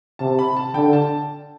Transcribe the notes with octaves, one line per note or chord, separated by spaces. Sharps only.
C3 A5
B5
A5
D3 G5
A5